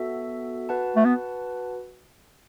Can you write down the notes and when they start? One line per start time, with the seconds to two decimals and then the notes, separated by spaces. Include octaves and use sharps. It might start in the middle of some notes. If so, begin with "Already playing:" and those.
Already playing: B3 F#4 A4 E5
0.69 F#4 B4 F#5 A5
0.96 A3
1.05 B3